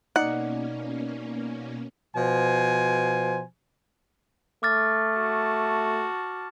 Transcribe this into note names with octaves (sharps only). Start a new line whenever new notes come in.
B2 A#3 C#4 D#4 D5 F#5
B2 F3 C5 G#5
A3 D6 F6 A6
F#4 A5